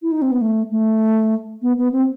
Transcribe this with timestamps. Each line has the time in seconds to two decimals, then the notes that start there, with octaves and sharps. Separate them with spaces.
0.02 E4
0.12 D#4
0.22 C4
0.32 B3
0.41 A3
0.71 A3
1.62 B3
1.78 B3
1.92 C4